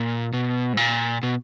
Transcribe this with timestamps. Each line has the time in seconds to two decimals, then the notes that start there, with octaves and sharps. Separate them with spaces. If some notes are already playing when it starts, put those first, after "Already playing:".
Already playing: A#2
0.33 B2
0.73 G#2
0.77 A#2
1.23 B2